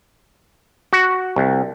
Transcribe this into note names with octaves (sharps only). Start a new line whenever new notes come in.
F#4
C2